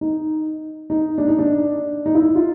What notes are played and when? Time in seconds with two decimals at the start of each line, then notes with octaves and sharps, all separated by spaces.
0.01 D#4
0.90 D#4
1.18 D4
1.28 D#4
1.39 D4
2.06 D#4
2.15 E4
2.22 D#4
2.35 F4